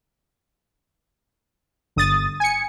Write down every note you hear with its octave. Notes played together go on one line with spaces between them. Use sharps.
G1 D#6 A6
G#5 C#7